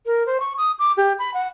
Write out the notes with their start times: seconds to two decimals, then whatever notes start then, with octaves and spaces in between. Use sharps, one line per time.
0.06 A#4
0.26 C5
0.40 C#6
0.58 D#6
0.79 D6
0.97 G4
1.19 B5
1.34 F#5